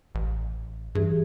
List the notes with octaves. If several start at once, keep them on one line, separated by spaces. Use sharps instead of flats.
A1
G2 E3 G4 G#4